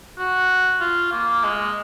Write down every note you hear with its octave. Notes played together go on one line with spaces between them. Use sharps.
F#4
F4
A#3
G#3